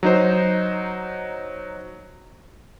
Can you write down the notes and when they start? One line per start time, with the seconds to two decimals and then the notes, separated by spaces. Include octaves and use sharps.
0.03 F#3 D#4 C5